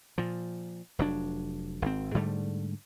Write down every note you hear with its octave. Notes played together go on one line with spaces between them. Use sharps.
A#2 F3
F1 F#3 D4
G#1 C4
G#2 D3 G3 A3